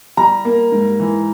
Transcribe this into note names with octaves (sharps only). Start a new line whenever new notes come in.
G3 A#5
A#3
G#2
E3